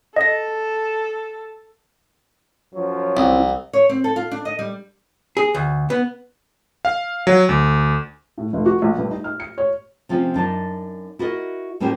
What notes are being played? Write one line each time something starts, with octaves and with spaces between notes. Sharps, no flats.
A4 D#5 A#6
F#2 F3 F#3
C2 C4 E4
C#5
C4
A4
F4
D4
D#5
G3
G#4
D2
B3
F5
F#3
D2
A2
F1
F#4
A#1
G2
D#4
F6
C#7
C#5
C3 F3 A3 C4 C#4
F#2 D4 D#4 A5
E4 F#4 A#4 D#5
A2 G3 A#3 C#4 G4 C5